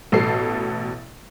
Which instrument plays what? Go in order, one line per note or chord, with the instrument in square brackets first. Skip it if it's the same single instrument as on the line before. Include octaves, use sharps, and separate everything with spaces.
[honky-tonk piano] A1 B2 A4 C7